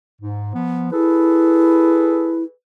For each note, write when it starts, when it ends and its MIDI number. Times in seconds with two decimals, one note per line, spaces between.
0.21 0.52 44
0.54 0.89 53
0.54 0.89 59
0.92 2.44 64
0.92 2.51 68
0.92 2.51 69
0.92 2.51 71